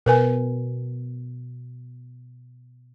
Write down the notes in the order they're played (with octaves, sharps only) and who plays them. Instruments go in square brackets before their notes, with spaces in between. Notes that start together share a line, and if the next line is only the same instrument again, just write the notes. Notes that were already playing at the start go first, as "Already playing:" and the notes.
[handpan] B2 [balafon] A#4 B4 G#5